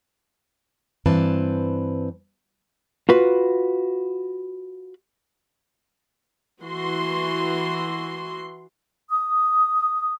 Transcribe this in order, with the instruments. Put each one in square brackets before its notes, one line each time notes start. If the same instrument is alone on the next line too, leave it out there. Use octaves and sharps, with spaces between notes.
[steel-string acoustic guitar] G2 E3 C4 B4 A5
[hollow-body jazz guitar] F4 F#4 B4
[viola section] E3 F#4 C6
[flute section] D#6